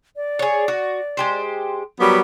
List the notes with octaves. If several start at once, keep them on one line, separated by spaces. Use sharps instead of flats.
D5
G#4 C#5
F#4
G#3 G4 C5
F#3 G3 B3 A#4